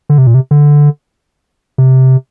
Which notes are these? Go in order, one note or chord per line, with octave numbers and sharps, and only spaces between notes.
D3
C3
A#2
C3
D3
C3